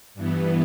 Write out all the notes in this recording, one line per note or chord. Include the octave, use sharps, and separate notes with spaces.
G2 E3 B3